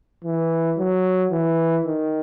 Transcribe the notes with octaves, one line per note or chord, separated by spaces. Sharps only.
E3
F#3
E3
D#3